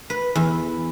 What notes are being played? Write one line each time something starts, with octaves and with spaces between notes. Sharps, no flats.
B4
E2